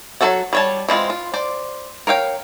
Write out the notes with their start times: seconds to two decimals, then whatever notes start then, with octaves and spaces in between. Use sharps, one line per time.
0.21 F#3 E4 F#4 A4 F#5
0.53 G3 C#5 A5
0.89 E3 G#3 C4 F4
1.10 F4
1.34 C5 D5
2.07 A#4 C#5 F5 G5